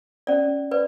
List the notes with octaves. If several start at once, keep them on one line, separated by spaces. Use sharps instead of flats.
C#4 D5
B4 D5